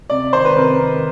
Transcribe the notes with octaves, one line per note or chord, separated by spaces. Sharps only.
C3 D5
D#3 C5
B4
C3 A#4
D#3